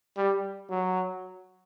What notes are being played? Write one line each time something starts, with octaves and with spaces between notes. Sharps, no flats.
G3
F#3